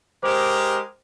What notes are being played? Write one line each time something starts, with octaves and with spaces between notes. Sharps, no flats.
G#3 G4 A#4 C5 D6